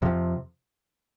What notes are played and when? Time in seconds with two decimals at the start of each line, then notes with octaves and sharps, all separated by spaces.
0.02 F2 C3 F3